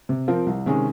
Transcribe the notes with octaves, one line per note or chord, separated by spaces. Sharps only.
C3
F3 C4 F4 A#4
C2
C3 D#3 G#3 C#4